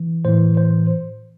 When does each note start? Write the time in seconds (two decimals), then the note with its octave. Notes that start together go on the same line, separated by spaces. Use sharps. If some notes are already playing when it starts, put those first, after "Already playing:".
Already playing: E3
0.25 A2 E3 C5
0.57 C5